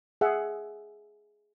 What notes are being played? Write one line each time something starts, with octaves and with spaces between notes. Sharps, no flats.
G#4 E5 F#5